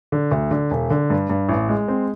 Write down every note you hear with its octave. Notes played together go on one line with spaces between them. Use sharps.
D3
D2
D3
E1
D3
G2
G2
A1
G#3
C4